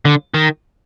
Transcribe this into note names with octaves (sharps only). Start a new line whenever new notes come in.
D3
D#3